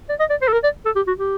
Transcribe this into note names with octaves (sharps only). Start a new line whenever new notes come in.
D5
D#5
D5
C5
A4
A#4
D5
A4
G4
F#4
G4